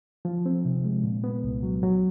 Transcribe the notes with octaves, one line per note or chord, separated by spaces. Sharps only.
F3
C4
C3
G#3
A#2
B3
C2
F#3
F#3